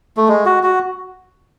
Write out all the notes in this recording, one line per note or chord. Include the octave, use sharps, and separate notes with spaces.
A3
G#3
F#4
F#4